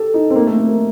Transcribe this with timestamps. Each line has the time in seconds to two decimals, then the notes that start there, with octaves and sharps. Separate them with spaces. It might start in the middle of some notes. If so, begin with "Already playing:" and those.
Already playing: G4 A4
0.14 D#4
0.30 C4
0.36 A#3
0.47 A3
0.57 A3
0.68 A#3